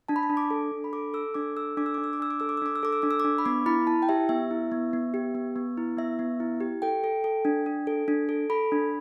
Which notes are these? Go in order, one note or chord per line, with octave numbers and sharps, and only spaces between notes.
D4 A5
B5
A5
D4
D6
A4
D4
B5
A4 D6
A4 E6
D4 D6
A4 E6
D4 D6
E6
D4 D6
E6
D6
D4 E6
D6
A4 E6
D6
E6
D4 D6
E6
A4 D6
E6
D4 D6
E6
D6
D4
B5
B3 D6
E4 B5
E4 A5
G5
G4 E5
B3 E5
E4
B3
B3
G4
B3
B3
E4
B3 E5
B3
E4
G4
A4 G5
A4
A4
D4
D4
A4
D4
A4
A4 B5
D4